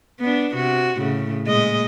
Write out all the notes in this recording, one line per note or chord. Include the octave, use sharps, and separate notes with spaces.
B3 D4
C3 F#4
A2 C#3
A#2 G#3 D#5